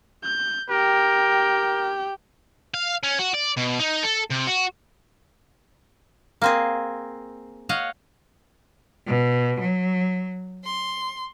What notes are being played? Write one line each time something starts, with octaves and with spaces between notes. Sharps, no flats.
G6
G4 A#4 G5
F5
C#4
F#4
D5
B2
D#4
A4
C3
F#4
A#3 C4 G#4
C#5 D#5 F5 F#5
B2
F#3
C6